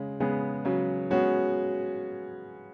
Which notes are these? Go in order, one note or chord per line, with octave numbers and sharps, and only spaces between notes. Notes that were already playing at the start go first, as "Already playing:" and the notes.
Already playing: C#3 G#3
C#3 G#3 B3 G#4
C#3 F#3
G#3 B3 C#4 F#4 G#4